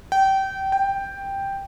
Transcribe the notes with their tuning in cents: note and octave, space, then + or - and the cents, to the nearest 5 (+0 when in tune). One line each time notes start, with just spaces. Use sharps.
G5 -25
G5 +5